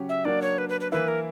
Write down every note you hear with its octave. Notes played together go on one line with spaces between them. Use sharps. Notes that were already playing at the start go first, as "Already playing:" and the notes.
Already playing: C#3 F#3 C#4 G4
E5
F#3 A#3 D4 D5
C#5
B4
B4
B4
E3 A#3 E4 B4
A#4